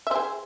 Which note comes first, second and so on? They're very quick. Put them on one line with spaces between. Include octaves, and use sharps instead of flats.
E5 C5 G#4